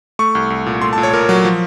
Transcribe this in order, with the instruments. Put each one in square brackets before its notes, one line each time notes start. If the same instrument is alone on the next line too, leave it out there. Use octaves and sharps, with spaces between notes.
[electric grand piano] A3 C#6
C2
C2
A#2
A3 C6
A5
A#2
C#5
A#2 A#4
F#3
F3